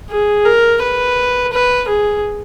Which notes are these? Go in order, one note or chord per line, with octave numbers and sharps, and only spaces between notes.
G#4
A#4
B4
B4
G#4